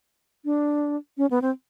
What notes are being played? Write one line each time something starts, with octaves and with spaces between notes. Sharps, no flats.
D4
C#4
B3
C4